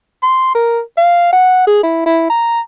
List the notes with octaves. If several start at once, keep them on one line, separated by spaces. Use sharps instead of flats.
C6
A#4
F5
F#5
G#4
E4
E4
A#5